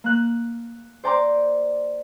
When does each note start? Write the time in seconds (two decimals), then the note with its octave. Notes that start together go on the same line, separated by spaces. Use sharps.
0.04 A#3 F#6
1.04 C5 D5 G5 A#5 C6 D6